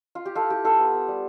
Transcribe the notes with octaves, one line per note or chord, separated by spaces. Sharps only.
F4
G4
E4 F4 A4
E4 G4
B3 F4 A4
B3
B3
G3